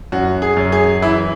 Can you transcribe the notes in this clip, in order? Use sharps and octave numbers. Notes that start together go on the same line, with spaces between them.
F#2 F#4
G#4
F#2
G#4
E3 E4